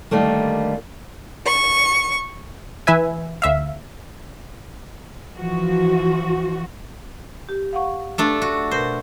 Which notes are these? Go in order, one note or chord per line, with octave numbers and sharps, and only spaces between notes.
D3 D#3 G3 A3 A#3
C#6
E3 B4 E5 G#5
D2 E5 F5
E3 F3 F#4
G4
F5 F#5 C#6
A3 D4 A4
F#4
B2 A#4 C5